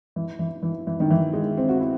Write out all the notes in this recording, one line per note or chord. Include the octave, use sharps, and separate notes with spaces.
E3
E3
E3
E3
D#3
E3
G#3
C4
F#4
E4